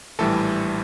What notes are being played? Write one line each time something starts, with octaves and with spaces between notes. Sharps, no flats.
A#1 A2 E3 G3 A4